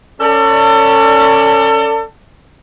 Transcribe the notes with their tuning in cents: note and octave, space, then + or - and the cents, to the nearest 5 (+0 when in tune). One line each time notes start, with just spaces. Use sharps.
C#4 +0 A4 +35 D5 +0